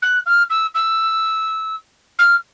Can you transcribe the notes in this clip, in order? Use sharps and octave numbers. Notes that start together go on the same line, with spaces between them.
F#6
F6
E6
E6
F6